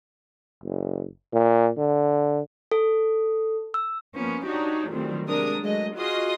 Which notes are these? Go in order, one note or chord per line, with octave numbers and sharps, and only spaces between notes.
F#1
A#2
D3
A4
E6
F3 A#3 B3 C#4
D4 D#4 F#4 G4 C#5
D2 A#2 D#3 F#3 G3 C4
C3 G#3 D4 A#4 D#6
F#3 G#3 A3 D#5
F4 F#4 G#4 D#5 C6 D#6